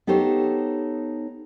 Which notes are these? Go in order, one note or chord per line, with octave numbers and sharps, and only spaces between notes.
B3 D#4 G4 A4 C5 C#5